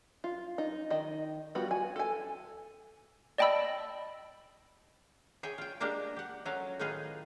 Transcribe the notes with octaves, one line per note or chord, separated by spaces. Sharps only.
F4
D#4
D#3 D#5
G3 B3 F4 F#4
G#5
A4 G#5
D5 D#5 G5 A5 B5 E6
G#4 C#5 E5 G5
F4 G5
G#3 A#3 D4 G4 A#4
G4 F#5
F#3 C#4 F4 A4 A#4
A2 D#3 D#4 F4 G#4 B4